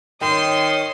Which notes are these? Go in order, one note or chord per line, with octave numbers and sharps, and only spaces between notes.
D#3 C#5 G5 C6 D#6